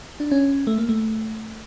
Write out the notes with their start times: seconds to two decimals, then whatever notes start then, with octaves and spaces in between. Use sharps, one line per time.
0.20 D4
0.31 C#4
0.67 A3
0.78 A#3
0.89 A3